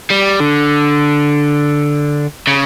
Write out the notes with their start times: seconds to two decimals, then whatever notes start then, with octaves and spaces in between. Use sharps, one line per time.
0.11 G3
0.40 D3
2.47 C#3